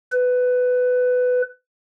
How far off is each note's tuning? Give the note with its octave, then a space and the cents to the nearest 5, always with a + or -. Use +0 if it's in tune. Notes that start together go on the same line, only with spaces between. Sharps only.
B4 +15